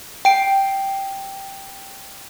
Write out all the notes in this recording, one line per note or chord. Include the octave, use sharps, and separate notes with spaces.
G5 D7